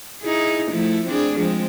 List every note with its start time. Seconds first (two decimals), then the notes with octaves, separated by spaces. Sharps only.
0.22 D#4 E4 G#4
0.72 F3 A3 E4
1.07 C4 D4 G#4
1.37 F3 G#3 C4